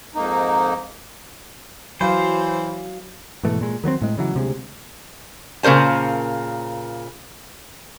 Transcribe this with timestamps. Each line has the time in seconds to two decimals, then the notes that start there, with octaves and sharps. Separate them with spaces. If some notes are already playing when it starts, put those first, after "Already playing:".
0.15 F2 G#2 A#3 D#4
2.01 E3 F#3 C5 F5
3.43 G#2 B2 E3 A3
3.61 A#2 G#3
3.84 D#3 F#3 A#3 C4
4.02 A2 G#3
4.18 C#3 E3 F#3
4.34 D2 C3 G#3
5.63 A#2 C#3 A#4 C5 A5